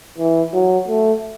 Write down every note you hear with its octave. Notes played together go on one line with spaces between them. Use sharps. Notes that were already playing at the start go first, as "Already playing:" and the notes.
E3
F#3
A3